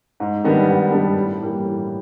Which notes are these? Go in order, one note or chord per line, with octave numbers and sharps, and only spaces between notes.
G#2
D#3 G3 B3 D4
G#2
D#3 G3 B3 D4
A2
E3 G3 A#3
A2